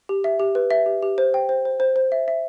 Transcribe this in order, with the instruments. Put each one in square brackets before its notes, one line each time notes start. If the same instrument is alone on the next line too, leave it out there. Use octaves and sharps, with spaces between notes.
[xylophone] G4
E5
G4
B4
E5
G4
G4
C5
G5
C5
C5
C5
C5
E5
E5